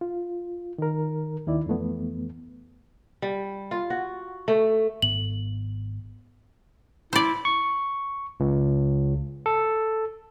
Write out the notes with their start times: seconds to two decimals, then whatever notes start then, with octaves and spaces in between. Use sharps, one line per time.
0.01 F4
0.78 D#3 A#4
1.47 D#2 D#3 E4 D5
1.66 F2 E3 A3 B3
3.22 G3
3.71 F4
3.90 F#4
4.48 A3
5.02 G#1 G#2 B3 F#7
7.13 E4 C5 D5
7.45 C#6
8.40 C#2
9.46 A4